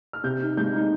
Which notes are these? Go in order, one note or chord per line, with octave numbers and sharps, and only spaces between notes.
F6
C3 G6
D#4
G#3 G6
D#4